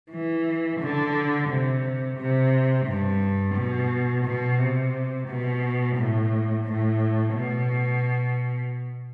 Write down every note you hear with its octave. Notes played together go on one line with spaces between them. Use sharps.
E3
D3
C3
C3
G2
B2
B2
C3
B2
A2
A2
B2